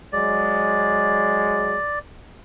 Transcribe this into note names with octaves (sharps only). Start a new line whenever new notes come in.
F#3 G#3 D5